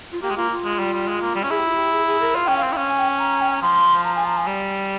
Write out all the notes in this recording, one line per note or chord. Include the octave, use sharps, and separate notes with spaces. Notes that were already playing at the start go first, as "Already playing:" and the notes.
F4
A#3 G4
G#3
A#3 F4
F4
G#3
G3
G3
G#3
A#3
G3
C#4
E4 G#4
G4
F4
G4
G#4
G#4
A#4
F4 F5
C#4 G5
F5
C4
E4
C#4
G#5
G5
G#5
A#5
G5
G#5
A#5
F3 C6
A#5
G#5
A#5
G#5
G3